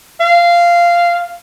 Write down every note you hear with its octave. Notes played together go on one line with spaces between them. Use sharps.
F5